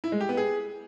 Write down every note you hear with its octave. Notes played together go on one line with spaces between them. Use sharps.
E4
G#3
G4
B3
G#4